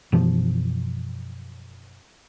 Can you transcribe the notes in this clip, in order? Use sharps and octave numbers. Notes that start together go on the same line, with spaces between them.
F#2 B2 E3 F3